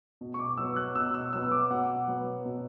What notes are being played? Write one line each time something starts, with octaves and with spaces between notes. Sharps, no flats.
B2
C#6
D6
F#3 B3 E6
F#6
B2 E6
E6
F#3 B3 E6
D6
B2 F#5
F#3 B3
B2